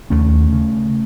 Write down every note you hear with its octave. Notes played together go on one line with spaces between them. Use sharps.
D#2 A3 C#4
C#3